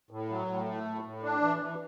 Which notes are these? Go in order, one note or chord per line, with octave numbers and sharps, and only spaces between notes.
A2
F#3
A2
A3
A2
A2
D4
E3
E3